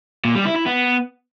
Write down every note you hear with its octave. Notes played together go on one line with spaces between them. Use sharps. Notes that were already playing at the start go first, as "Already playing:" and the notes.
A#2
G3
E4
E4
B3